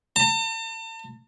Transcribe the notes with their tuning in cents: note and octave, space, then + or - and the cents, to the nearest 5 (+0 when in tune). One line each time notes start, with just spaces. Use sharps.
A5 +45